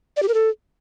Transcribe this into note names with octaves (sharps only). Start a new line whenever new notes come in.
D5
G4
A#4
A4